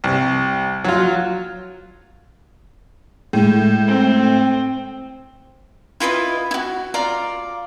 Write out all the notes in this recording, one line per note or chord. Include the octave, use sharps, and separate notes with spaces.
C2
F#3 F4
A2 G#3
C4
E4 F4 B4 D#5
E4 F#4
F4 D5 F5 A#5